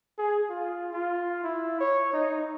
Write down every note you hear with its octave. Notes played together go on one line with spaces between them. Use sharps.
G#4
F4
F4
E4
C#5
D#4